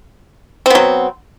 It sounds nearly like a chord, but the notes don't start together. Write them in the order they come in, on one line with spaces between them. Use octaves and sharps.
C4 B3 F#3